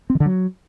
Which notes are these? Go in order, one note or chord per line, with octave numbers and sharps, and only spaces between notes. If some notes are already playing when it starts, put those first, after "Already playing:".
C4
D#3
D3
F#3